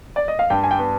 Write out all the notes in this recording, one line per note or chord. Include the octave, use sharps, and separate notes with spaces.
D5
D#5
F5
G2 G5
G#5
G5
B3